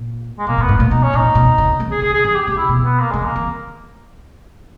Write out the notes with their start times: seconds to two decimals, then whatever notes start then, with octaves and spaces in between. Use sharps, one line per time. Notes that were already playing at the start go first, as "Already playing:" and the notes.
Already playing: A#2
0.38 G#3
0.47 B2 A#3
0.58 A#2
0.61 B3
0.69 G#2
0.80 A#2
0.90 B2 D#4
1.03 C#4
1.13 A#2 D#4
1.35 B2
1.58 C#3
1.80 C#3
1.91 G#4
2.02 C#3 G#4
2.14 G#4
2.25 D#3 G#4
2.36 G4
2.47 C#3 G4
2.58 E4
2.69 B2
2.84 B3
3.00 A#3
3.11 C#3 G#3
3.25 A#3
3.36 D#3